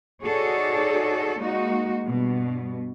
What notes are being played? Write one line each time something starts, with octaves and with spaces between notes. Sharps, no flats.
D#4 F#4 G#4 A4 C#5 D5
G#3 A#3 D#4 F#4
G2 B2